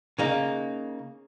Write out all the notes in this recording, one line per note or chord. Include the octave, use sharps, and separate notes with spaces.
C#3 A#3 D#4